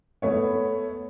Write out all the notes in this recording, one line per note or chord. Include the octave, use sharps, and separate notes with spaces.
A3 B3 C#5